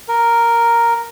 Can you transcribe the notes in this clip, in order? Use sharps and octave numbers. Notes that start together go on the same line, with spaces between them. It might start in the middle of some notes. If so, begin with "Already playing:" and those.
A#4